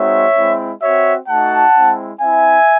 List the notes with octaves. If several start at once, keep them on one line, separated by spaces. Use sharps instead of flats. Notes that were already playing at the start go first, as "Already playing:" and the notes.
Already playing: G#3 C4 D#4 F#4 C#5 E5
G#3 C4 E4
C4 F#4 C#5 E5
A3 D#4 F#4 F#5 A5
G#3 C4 E4
C4 E4 E5 G#5